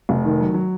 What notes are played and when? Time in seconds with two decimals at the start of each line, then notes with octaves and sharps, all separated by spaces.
0.09 F1
0.25 D#3
0.40 F#3
0.54 F#3